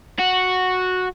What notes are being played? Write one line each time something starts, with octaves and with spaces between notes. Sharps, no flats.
F#4